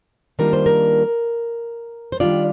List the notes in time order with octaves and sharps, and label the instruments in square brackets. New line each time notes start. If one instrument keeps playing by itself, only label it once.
[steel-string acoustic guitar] D#3 G3 A#3 D4 F4 A#4
C5
A#4
C5
D#3 G3 D4 F4 D5